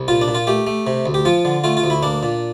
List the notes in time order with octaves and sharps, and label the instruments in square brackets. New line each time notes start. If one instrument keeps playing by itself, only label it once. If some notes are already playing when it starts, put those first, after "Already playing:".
Already playing: [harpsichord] C2
A#2 F4
D4
A#2
F4
A3 G4
A3
C3
D2
G4
F3 F4
D3
A3 F4
F4
D2
E4
A#3 D4
A#2